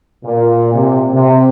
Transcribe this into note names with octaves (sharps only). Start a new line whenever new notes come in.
A#2
C3
C3